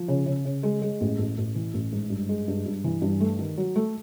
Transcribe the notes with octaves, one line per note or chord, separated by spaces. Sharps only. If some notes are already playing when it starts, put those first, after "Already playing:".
Already playing: F3
C#3
C#3
C#3
G#3
G#3
A1
A1
A1
E3
A1
G#2
G2
G#3
G2
G2
E3
G2
A3
D#3
F#3
A3